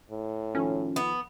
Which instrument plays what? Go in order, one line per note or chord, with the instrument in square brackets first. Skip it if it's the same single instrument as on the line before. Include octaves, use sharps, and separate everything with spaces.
[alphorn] A2
[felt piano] D#3 F3 A4 [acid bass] C#4
[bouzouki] B3